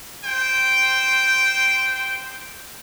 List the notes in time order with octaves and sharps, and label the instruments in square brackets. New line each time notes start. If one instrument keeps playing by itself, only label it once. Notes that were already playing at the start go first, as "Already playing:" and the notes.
[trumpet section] C5 G5